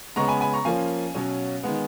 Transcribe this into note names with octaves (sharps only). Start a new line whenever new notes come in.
C#3 G#3 B3 A#5 C#6
G#5 B5
G#5 B5
A#5 C#6
F3 A#3 C#4 F5 G#5
B2 F#3 C#4
D#3 G#3 B3